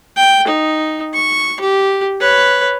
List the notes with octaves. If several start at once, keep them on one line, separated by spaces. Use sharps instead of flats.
G5
D#4
C#6
G4
B4 C#5